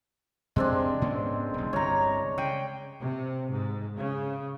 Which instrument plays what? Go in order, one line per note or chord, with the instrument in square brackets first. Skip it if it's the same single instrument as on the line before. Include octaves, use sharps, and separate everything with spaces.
[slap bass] F2 C3 [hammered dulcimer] G#3 C4 D4
[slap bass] G#2 B3 C#4
E1 C2
[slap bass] G1 C2 [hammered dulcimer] C#5 A#5
[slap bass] C#3 [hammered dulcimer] G5
[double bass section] C3
G#2
C#3